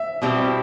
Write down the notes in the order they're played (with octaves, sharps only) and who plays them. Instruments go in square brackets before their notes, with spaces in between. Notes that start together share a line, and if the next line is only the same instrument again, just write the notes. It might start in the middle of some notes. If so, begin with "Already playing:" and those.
Already playing: [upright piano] E5
[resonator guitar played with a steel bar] B2 G3 C4 E4 G4